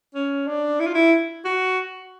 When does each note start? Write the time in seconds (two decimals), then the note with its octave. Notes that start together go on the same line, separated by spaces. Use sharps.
0.15 C#4
0.47 D4
0.79 E4
0.87 F4
0.94 E4
1.45 F#4